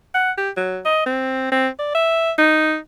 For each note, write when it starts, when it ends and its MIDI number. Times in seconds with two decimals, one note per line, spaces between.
0.14 0.31 78
0.38 0.50 67
0.57 0.80 54
0.85 1.06 75
1.06 1.51 60
1.52 1.68 60
1.79 1.91 74
1.95 2.31 76
2.39 2.77 63